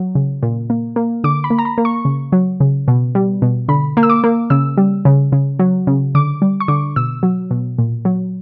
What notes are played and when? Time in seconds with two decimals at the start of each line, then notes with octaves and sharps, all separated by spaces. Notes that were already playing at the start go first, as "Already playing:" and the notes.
Already playing: F#3
0.15 C#3
0.43 A#2
0.70 A#3
0.96 A#3
1.24 D3 D6
1.44 B5
1.50 A#3
1.59 A#5
1.65 B5
1.78 A#3
1.85 C#6
2.05 C#3
2.32 F#3
2.60 C#3
2.88 B2
3.15 G3
3.42 B2
3.68 D3 B5
3.97 A#3
4.03 E6
4.10 D6
4.24 A#3
4.50 C#3 E6
4.77 G3
5.05 C#3
5.32 C#3
5.59 F#3
5.87 C#3
6.15 D3 D6
6.42 G3
6.60 C#6
6.68 D3 D6
6.96 B2 E6
7.23 F#3
7.51 B2
7.78 A#2
8.05 F#3